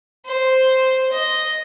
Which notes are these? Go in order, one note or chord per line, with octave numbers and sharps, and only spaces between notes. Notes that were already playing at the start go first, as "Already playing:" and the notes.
C5
D#5